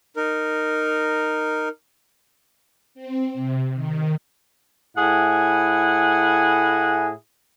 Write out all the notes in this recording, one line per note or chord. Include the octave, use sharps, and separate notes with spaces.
D#4 A#4
C4
C3
D#3
A2 E4 G#4 F#5 G#5